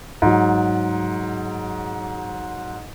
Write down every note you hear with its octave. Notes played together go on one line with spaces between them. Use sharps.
G#2 F#3